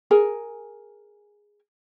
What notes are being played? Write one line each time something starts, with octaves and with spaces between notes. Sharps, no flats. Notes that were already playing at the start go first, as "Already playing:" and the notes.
G#4 A#4 G#5